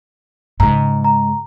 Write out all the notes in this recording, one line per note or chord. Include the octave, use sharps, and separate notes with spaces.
G#2 C#3 A#5
A#5